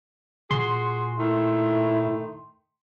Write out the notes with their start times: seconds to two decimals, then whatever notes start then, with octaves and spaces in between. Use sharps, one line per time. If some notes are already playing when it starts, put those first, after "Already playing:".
0.51 A#2 F#4 G#4 C6
1.20 D#3 A3 E4